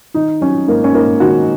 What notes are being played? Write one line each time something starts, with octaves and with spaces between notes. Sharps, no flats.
D#3 D#4
F#3 C#4
G#2 A#3
C#4
G#2 A#3
D#3 F#4